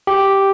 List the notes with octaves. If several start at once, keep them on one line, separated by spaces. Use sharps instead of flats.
G4